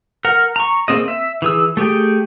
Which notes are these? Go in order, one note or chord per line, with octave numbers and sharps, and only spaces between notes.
A#4 F#5 A#5
A#5 C#6
A#3 C4 G#4 D#5
E5
E3 G#4 E6
A3 G4 G#4 G5